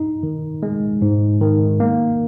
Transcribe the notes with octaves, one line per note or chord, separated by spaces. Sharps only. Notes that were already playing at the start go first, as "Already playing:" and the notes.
Already playing: D#4
D#3
G#3
G#2
D#3
A#3